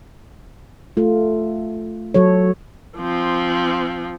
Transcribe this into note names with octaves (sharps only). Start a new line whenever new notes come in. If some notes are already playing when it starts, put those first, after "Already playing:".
A3 F4
F#3 A4 C#5
F3 C4